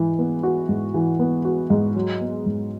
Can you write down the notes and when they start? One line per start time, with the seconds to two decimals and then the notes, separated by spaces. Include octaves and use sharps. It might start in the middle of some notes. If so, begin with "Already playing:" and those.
Already playing: G#2 E3
0.19 B3
0.43 F#4
0.69 G#2
0.94 E3
1.19 B3
1.45 F#4
1.70 G#2
1.96 F#3
2.21 B3
2.46 G#2